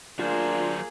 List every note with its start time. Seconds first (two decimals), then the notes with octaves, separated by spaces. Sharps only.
0.19 F#3 A#3 D4 F4 G#4 C5